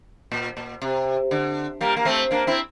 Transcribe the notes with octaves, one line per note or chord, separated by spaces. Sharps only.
A#2
A#2
C3
D3
G3 A#3
A#3
A3 C4
A#3 D4
C4 E4